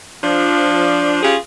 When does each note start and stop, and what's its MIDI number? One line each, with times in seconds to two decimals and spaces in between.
0.24 1.19 53
0.24 1.19 62
1.23 1.37 61
1.23 1.37 65
1.23 1.37 67
1.23 1.37 68